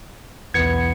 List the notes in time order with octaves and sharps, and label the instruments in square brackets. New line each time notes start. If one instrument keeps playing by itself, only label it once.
[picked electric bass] B1 E2 [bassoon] B3 [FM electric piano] G#6 C#7